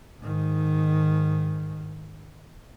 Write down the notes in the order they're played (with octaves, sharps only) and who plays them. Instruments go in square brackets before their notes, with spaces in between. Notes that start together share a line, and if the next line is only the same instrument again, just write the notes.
[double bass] G#2 D#3